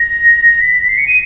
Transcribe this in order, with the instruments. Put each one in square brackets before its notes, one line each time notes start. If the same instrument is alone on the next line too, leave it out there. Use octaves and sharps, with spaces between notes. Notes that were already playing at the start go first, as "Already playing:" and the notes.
Already playing: [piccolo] A#6
B6
C7
C#7
D#7